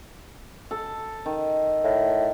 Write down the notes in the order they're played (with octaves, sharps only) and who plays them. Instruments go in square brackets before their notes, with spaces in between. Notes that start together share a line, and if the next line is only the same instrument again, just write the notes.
[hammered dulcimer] A4
D#3
[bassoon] A2